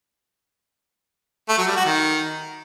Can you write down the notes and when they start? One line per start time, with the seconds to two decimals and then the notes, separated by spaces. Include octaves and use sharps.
1.49 A3
1.58 F#3
1.67 G3
1.76 F#4
1.86 D#3